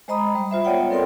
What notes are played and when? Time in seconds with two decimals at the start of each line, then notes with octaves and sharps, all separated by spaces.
0.08 G#3 C5 D#5 A#5 B5 D#6
0.35 G3
0.50 F4 C5 E5 B5
0.65 B3 F4 C#5 D5 F#5 G5
0.90 C4 A4 A#4 D5 G5 C6